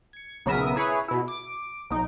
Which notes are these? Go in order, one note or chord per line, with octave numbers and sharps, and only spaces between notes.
G#6 C#7
B1 C#3 B3 A#4 E5 D#6
E4 G#4 B4 C#5
B2 E4
D6
B1 D#4 D7